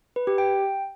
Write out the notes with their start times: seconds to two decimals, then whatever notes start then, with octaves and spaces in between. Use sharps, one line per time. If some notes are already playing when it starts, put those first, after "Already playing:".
0.16 B4
0.27 G4
0.38 G5